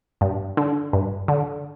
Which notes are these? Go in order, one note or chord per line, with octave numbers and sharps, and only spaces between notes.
G2
D3
G2
D3